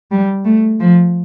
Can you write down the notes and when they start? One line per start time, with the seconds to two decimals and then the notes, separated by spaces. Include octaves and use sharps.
0.11 G3
0.45 A3
0.80 F3